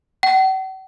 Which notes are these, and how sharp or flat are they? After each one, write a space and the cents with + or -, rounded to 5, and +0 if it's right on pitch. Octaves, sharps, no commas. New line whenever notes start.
F#5 +45